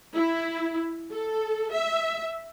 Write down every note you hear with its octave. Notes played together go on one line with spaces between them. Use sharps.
E4
A4
E5